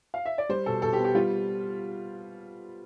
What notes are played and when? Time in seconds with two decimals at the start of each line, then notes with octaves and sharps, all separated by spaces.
0.14 F5
0.26 E5
0.38 D5
0.49 G3 C5
0.66 B2 A4
0.82 B2 A4
0.93 G4
0.99 B3
1.04 G4
1.15 G3 F4